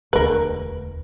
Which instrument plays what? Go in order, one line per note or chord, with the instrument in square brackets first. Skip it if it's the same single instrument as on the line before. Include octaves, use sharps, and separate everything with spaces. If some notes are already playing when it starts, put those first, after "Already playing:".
[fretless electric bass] E1 D2 [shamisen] A#4 B4